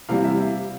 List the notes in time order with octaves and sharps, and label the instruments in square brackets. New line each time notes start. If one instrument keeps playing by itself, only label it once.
[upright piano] E2 C3 E3 G3 F5
E5